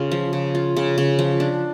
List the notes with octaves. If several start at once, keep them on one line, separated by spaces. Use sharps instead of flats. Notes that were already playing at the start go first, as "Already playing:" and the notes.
Already playing: C#3 F4
F3
C#3
F4
C#3
C#3
F3
D4